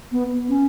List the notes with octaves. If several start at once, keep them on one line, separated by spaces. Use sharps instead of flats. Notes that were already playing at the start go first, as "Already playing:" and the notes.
B3
C#4